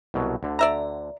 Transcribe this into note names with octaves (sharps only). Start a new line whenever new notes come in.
C2 B2 F#3
D2 D3
D5 E5 A#5